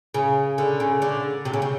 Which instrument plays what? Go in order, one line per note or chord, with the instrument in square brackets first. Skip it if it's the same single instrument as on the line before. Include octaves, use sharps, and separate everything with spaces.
[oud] C#3
D3
C#3
D3
C3
C#3
C3